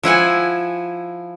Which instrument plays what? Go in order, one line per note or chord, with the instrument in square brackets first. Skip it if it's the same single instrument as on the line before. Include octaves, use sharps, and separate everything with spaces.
[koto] F3 E4 F#5 G#5